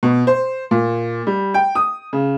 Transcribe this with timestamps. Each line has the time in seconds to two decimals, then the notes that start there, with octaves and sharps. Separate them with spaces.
0.03 B2
0.27 C5
0.71 A#2
1.27 G3
1.54 G5
1.75 D#6
2.13 C#3